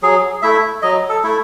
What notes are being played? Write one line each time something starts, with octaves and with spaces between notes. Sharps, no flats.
F#3 G#4
A3 E4 E5
F#3 D#5
A4
A3 E4